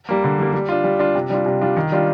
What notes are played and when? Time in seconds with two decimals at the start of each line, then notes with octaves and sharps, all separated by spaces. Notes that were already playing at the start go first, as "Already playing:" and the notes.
0.09 G3 A#3
0.24 D3
0.39 G3 A#3
0.53 G3
0.69 D4 F4
0.84 G3
0.99 D4 F4
1.15 C3
1.30 G3 D4 F4
1.46 C3
1.61 G3 D4 F4
1.77 D#3
1.92 G3 D4 F4